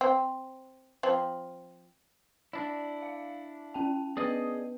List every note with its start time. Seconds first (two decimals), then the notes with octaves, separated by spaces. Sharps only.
0.01 C4
1.03 F3 C4
2.53 D4 E4 D5
3.02 F5
3.74 C#4 G5 A5
4.17 B3 G#4 B4 D5 D#5